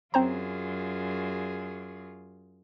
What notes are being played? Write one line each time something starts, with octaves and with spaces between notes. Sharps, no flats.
F#2 C4 F4 G#4 C5 A#5